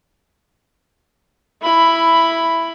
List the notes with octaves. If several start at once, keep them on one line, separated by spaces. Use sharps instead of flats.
E4 B5